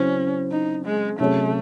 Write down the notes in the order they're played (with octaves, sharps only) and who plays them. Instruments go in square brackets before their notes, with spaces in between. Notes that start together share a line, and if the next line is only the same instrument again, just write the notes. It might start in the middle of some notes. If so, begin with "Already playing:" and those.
Already playing: [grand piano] C#3 F#3 C4 E4 C5 [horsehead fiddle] C#4
[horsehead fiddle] D#4
G#3
[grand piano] C3 F#3 C#4 G#4 C#5 [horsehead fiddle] A3